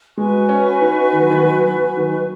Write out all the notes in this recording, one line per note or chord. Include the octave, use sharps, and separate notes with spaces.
G#3 F#4 B4 G#5 C#6
C#4
D#4
D#3
F#3
D#3
F#3
F#3
D#3
F#3